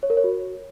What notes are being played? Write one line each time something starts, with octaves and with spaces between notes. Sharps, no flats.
C#5
A#4
C#5
F#4